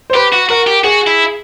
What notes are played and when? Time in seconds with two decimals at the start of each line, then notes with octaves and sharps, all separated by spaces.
0.10 C5
0.14 G4 B4
0.33 F#4
0.49 F#4 A#4
0.67 G4
0.84 F#4 G#4
1.07 E4